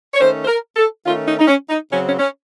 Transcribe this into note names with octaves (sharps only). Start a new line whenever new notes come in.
C#5
D#3 A3 C#4 C5
C5
A#4
A4
D#3 A3 C#4 F4
D#4
D#4
C#4
D#4
C#3 F#3 C4 C#4
C#4
C#4